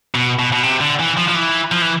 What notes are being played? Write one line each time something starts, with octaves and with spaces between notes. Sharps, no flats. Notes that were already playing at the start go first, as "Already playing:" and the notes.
B2
B2
B2
C3
D3
E3
F3
F3
E3
F3
E3